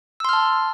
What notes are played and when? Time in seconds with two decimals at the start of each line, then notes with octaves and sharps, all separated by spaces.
0.20 E6
0.25 C6
0.29 F6
0.33 A5